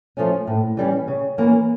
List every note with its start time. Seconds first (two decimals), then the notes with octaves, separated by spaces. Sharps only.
0.17 F3 A3 C#4
0.47 A2
0.77 E3 G3 C#4
1.08 C#3
1.38 E3 A#3 C#4